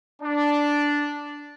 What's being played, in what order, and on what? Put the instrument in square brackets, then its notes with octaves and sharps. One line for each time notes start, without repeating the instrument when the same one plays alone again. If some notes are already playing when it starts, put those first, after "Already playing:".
[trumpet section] D4